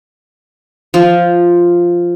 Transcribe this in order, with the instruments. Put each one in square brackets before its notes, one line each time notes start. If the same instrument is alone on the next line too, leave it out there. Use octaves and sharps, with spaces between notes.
[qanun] F3